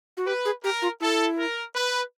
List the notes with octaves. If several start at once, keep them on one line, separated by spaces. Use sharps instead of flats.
F#4
G4 B4
G#4
G4 A#4
F4
E4 A4
A#4
B4